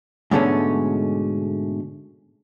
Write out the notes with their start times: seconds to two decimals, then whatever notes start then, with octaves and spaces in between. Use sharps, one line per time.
0.31 G#2 B2 D3 G#3 A3 C#4